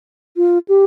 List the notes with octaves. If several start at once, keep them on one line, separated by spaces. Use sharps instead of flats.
F4
G4